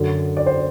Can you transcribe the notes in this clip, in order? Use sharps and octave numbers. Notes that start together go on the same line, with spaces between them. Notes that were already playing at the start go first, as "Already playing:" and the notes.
Already playing: F#2 D3 F#3
D5
C5